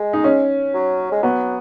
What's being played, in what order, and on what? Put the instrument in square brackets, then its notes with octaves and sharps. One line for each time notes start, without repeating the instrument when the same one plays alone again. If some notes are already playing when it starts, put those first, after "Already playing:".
Already playing: [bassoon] G#3
[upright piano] D#4
C#4
[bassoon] F#3
G#3
[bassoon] F#3 [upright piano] B3